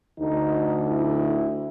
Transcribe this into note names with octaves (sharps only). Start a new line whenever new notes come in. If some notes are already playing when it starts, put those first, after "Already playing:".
D2 D3 D#4
E4